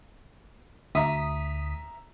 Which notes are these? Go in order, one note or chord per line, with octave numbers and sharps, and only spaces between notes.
D2 E5 A#5 D#6 B6